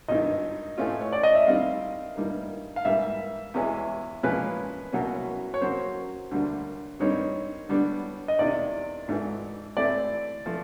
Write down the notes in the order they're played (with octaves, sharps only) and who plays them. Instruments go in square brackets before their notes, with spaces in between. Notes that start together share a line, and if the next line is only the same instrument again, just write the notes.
[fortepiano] G#1 G2 D#3 [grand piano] D#5
[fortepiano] A2 E3 A3 C#4 F4
[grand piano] C#5
D5
D#5
E5
[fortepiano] D#3 G3 C4 [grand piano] F5
[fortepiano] G2 D#3 G3 A#3
[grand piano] F5
[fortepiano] G#2 E3 G3 A#3 [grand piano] E5
[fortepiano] E2 C#3 E3 G#3 C#4
[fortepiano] A#2 F3 G#3 C#4 F4 [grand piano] B4
[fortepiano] C2 B2 F#3 A#3 C#4
[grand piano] C#5
[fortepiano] C#3 F#3 A#3 [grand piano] C5
[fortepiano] D2 D3 G3 A#3 D4
[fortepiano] G2 D#3 G3 C4 D#4 [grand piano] C#5
[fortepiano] D3 G3 B3 D4
[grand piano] D#5
[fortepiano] E2 C3 D#3 [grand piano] D5
[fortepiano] G#1 G#2 E3 A3
[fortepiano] A2 E3 A3 C4 E4 [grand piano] D5
[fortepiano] F3 A3